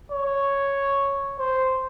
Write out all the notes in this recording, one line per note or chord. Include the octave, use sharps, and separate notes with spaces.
C#5
C5